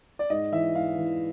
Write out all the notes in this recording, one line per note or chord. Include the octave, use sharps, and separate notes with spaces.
D5
G#2 D#5
E3 E5
G#2 F5
E3